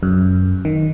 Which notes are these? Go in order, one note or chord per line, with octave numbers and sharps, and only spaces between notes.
F#2
D#3